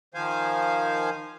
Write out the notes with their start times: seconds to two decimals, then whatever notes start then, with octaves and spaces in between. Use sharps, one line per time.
0.14 D#3 F3 C5 F5 G#5